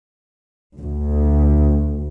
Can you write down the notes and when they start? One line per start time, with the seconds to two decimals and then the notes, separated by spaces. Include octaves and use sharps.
0.77 D2